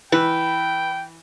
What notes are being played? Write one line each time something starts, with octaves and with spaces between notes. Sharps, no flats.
E3 B4 G5